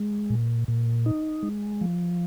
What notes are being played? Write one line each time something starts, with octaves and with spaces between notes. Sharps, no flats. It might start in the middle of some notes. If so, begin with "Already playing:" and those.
Already playing: G#3
A#2
A#2
D#4
G#3
F3